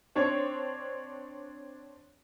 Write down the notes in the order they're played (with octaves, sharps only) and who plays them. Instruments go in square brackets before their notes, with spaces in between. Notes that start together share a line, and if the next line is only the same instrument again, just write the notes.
[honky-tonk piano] C4 D4 C#5